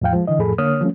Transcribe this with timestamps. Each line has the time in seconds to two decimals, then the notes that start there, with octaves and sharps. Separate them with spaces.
0.02 E2 A2 F3 F5 G5
0.13 F3 G#3
0.27 D3 E3 D#5
0.39 F2 A2 F3 G#4 A4 B5
0.58 D3 A#3 C#5 D#6 F6
0.81 F3 G3 A3 C#4